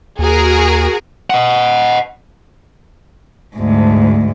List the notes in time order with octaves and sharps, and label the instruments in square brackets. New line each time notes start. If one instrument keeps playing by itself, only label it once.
[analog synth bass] D#2 [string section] F#4 G#4 A#4
[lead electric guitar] D#5 F#5
[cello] D2 G#2